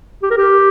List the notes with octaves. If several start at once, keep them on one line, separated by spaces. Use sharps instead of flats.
G4
A#4
G4